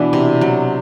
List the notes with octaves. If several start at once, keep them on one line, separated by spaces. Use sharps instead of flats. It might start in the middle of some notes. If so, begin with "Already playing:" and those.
Already playing: B2 E3 D4 E4
C3
F#3